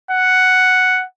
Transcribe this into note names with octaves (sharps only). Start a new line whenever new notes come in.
F#5